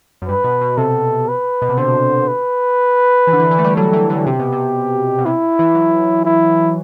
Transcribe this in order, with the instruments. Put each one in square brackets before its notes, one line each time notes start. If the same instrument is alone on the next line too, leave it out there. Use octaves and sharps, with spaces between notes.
[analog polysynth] F#2
[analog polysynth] G2 [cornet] B4
[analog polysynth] B2
B2
[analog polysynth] C3 [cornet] A4
[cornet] B4
[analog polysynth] B2
C3
[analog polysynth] D3 [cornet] C5
[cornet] B4
[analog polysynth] E3
D3
E3
E3
A3
G3
[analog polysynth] F#3 [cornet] A4
[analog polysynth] E3
D3
[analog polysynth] C3 [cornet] G4
[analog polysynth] B2
C3
B2
[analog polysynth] C3 [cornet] E4
[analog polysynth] E3
F#3
[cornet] E4